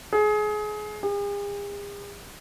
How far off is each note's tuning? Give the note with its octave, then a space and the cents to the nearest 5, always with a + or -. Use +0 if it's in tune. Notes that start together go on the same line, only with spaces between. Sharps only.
G#4 +25
G#4 -45